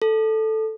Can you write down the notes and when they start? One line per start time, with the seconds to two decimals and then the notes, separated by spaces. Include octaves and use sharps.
0.02 A4